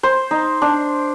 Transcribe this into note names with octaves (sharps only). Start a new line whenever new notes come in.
C5
D#4
D4